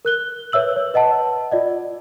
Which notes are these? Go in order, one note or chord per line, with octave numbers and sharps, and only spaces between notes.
A#4 F#6 G7
B4 C#5 E5 E6 F#7
C#5
B4 D#5 F#5 A5
F4 D5 D#5